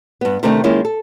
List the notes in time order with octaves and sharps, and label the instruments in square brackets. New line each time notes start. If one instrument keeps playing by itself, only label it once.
[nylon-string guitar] G2 B3
C3 D#3 A3 B3 D4 D#4
D#3 G#3 A#3 C#4 E4 F4
A4